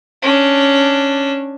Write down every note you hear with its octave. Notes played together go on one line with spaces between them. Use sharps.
C#4 D4